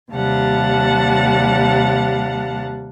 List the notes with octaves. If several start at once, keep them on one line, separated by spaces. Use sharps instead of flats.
D#2 C3 G3 F5 F#5 A5